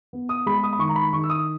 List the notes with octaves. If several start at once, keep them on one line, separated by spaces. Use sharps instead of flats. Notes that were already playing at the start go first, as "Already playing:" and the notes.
B3
D#6
G#3 B5
D#6
B5
D#3 C#6
A#5
B5
D#3 C#6
E6
D#6